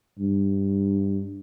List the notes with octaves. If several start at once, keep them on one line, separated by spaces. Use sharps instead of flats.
G2